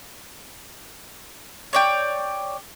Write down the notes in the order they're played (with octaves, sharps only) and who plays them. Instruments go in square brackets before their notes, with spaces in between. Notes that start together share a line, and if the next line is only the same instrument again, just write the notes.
[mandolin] C#5 D5 G5